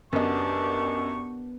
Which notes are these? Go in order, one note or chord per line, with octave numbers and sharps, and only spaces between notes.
F#2 B3 D4 G4 D#5 C#6